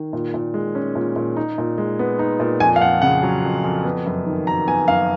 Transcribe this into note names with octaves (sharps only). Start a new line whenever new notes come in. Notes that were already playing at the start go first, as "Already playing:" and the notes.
Already playing: D#3
A#2
A#2
G#3
C#4
A#2
A#2
D#4
A#2
G#3
B3
D#4
A#2
F2 G#5
F5
F2 F#5
C#3 F#5
F#3
F2
F2
B3
F#2
D#3
F#3 A#5
B3 G#5
F#2 F5